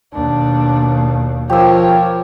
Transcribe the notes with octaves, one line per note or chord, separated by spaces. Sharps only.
D#2 B2 D4
F3 G4 A#4 C#5 E6